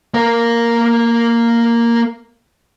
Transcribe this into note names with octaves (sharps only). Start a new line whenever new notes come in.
A#3 A#4